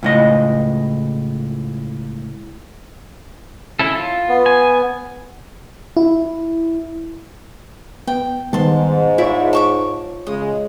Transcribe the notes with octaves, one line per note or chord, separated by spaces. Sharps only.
C#2 A2 D#5
C#4 E4 A4
F4
B3
G#5
E4
B3 G5
G#2 D#3 G3 B3 A5 C6
E4 F4 C#5 D5 E5
A5 C#6 D6
C#3 G#3 D#6